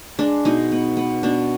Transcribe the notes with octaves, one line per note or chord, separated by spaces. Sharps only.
G#3 D4
B2 D#4
B3
B3
B2 D4